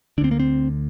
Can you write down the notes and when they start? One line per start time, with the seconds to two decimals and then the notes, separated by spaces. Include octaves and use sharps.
0.18 D3 D4
0.21 D2 C4
0.31 A#3
0.40 C4